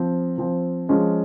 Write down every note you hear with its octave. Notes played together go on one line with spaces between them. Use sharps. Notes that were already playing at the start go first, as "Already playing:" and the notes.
Already playing: F3 C4
F3 C4
F3 G#3 C#4